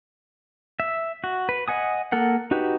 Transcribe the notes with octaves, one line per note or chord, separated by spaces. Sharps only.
E5
F#4
B4
D#5 F#5 G#5 D#6
A#3 A4 A#4 F#5
D#4 F#4 G4 B4